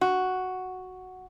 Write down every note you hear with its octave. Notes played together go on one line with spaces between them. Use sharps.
F#4